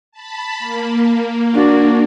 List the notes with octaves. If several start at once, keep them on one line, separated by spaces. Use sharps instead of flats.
A5 B5
A#3
D4 F#4